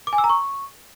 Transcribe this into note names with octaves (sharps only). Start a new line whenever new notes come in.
D6
G#5
E6
A#5
C#6